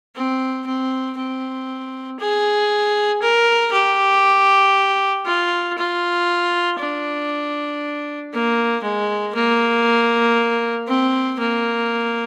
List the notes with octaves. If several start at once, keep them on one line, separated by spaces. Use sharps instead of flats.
C4
C4
C4
G#4
A#4
G4
F4
F4
D4
A#3
G#3
A#3
C4
A#3